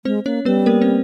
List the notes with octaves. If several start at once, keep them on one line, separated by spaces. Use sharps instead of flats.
G#3 C4 C5
A#3 C#4 C#5
G3 B3 B4
A#3 A#4
C4 C5